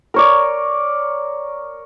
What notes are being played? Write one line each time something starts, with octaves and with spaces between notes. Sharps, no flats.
A#4 C#5 D5